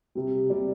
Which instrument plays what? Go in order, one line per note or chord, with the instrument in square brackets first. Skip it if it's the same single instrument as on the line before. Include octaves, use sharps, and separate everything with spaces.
[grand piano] C3 G3
C3 G3 D5